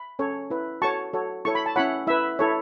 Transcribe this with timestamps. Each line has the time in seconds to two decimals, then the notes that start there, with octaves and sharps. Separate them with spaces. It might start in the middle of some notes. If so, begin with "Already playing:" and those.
Already playing: B5
0.19 C#4 A4 C#5
0.50 E4 B4
0.82 F#4 A4 C#5 A5 C#6
1.13 F#4 A4 C#5
1.45 E4 A4 C#5 C#6
1.55 B5
1.66 A5
1.76 C#4 E4 C#5 F#5 B5
2.07 E4 B4 E5
2.39 E4 A4 C#5